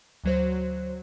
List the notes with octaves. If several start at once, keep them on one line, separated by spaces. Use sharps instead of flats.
D2 F#3 C5